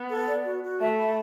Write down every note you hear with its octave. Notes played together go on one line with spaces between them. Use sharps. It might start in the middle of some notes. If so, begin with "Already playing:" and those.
Already playing: B3
A4
D5
F#4
F#4
A3 E5
B5